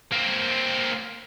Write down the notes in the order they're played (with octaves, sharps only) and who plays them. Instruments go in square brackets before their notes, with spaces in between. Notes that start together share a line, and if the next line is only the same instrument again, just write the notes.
[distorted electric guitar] A#3 C4